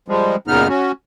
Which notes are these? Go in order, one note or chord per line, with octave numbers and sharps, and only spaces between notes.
F3 G3 G#3
F#2 A#2 C#3 B3 D#4 F6
C#4 F#4